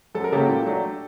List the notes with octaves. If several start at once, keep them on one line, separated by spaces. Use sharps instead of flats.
F#2 A4
A#4
C#3 F#3 A#3 G4 A4
A#2
F#3 A3 D4